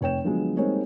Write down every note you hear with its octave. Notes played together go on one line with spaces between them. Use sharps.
F1 C#5 G5 E7
D3 F3 F#3 G#3 B3
G3 G#3 A#3 C4 D#4 C#5